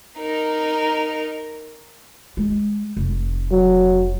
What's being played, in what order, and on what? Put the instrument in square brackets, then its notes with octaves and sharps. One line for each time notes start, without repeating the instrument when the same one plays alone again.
[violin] D#4 A#4
[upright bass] G#3
F1
[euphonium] F#3